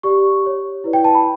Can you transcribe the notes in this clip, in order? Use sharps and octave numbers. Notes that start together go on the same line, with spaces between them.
G4 D5 C#6
G4 C#5
E4 B4 D5
G5
A5
B5